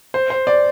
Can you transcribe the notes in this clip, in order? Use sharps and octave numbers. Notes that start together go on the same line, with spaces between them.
C5
C5
D5